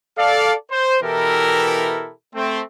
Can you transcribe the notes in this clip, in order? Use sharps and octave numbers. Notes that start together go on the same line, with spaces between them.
A4 D5 F5
C5
B2 E3 E4 G4 A4 A#4
A3 C4